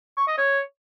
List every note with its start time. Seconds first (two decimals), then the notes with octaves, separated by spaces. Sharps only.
0.17 C#6
0.27 D#5
0.38 C#5